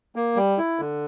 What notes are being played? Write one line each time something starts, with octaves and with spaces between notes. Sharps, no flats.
A#3
G3
E4
D3